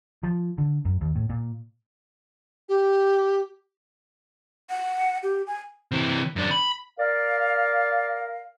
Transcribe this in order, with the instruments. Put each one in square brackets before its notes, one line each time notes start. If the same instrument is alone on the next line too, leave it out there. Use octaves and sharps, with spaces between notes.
[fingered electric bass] F3
D3
F#2
D#2
A2
A#2
[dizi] G4
[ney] F#5
G4
G#5
[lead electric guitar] C3 E3
F#2 D4
B5
[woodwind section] A#4 D5 F5